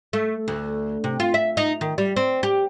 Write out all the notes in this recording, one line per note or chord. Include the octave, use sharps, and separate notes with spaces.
A3
D2
C3
F4
E5
D#4
D#3
G3
C4
G4